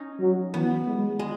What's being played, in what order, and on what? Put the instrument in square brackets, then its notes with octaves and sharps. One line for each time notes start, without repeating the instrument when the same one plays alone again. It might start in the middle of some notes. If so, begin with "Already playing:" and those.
Already playing: [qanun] C#4 D#4
[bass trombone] F#3
[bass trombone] E3 [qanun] B3
[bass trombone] G#3
[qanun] G#3